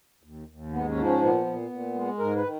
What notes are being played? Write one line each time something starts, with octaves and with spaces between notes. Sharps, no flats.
D#2
D#2
G#2 B3
C#4
F3
C#4
A#2 B3
A#2
A#2
G#3
G#2 A#4
B4
D#3